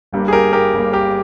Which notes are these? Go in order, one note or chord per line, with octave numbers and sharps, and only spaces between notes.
G1 G2 G3 A#3
G#4
G4 A#4
G4 A#4
G1 G2 G3 A#3
G4 A#4